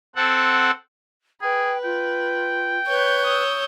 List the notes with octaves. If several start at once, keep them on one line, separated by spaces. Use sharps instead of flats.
C4 A4 F#5
G#4 B4 G5
F4 G5
B4 C#5 G6
D#6 E6